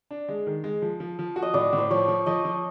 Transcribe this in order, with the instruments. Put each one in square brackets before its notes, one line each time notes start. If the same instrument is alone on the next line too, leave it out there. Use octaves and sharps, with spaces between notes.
[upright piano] D4
G#3
D#3
G#3
F3
F3
F3
F#4
[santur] D#5
[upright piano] A2 [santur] D5
[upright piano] A2
[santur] C5
[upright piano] F3 [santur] C#5
[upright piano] F3
[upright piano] F3 [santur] D#5
[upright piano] F3